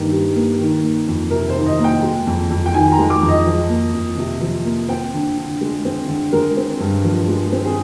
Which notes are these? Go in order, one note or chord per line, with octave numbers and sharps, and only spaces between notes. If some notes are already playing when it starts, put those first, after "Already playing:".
Already playing: G2 D#3 G3 A#3
G3
A#3
D#3
A#3
F2
C3 A#4
C5
D#3
D#5
A#3 G5
G#3
F2
F2
G5
D#3 G#5
A#5
G#3
D6
F2
D#5
F3
A#3
F2
C3
F3
A#3
C4 G5
D3
D3
G#3
C4
D3
G#3 A#4
C4
G2
F3
G#3
C4
G#4